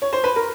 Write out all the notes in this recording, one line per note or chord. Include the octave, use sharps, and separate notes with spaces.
C#5
C5
B4
A#4